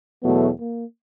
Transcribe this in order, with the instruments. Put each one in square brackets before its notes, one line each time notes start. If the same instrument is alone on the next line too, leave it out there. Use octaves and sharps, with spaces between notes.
[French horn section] E2 B2 F#3 A3 [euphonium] B3
[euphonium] A#3